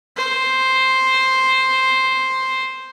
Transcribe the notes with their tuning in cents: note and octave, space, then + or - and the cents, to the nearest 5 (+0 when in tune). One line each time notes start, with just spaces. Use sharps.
C5 +5